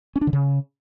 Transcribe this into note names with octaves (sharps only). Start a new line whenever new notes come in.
C#4
D4
D3
C#3